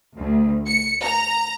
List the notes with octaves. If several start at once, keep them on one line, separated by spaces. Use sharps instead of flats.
D2
C#7
A#5